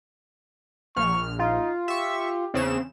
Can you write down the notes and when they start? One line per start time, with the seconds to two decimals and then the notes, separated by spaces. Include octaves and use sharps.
0.96 A#1 C#6 F6
1.39 D#4 F4
1.88 G4 E5 C#6
2.54 E2 C#3 C4 E7